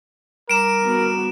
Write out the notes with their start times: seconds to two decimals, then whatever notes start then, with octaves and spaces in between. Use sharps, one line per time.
0.49 G3 A#4 A#5 D6 D7 E7
0.82 B3 F#4